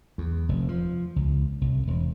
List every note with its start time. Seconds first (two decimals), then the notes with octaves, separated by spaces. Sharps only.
0.18 E2
0.49 F1
0.69 F3
1.16 C#2
1.61 C2
1.87 E1